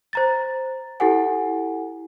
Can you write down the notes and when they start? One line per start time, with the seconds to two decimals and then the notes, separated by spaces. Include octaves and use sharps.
0.13 C5 A#5 A6
1.00 E4 G4 A4 F#5 G#5